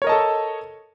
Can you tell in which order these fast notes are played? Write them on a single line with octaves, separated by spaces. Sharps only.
C#5 A#4 D#5 A5 A4